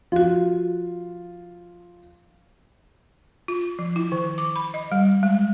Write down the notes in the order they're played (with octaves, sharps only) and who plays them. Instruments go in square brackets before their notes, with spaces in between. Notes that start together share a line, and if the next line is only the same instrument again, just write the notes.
[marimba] F3 F#4 [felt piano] F4
[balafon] F4
F3
E4
D#3
D6
B5
D#5
G3
G#3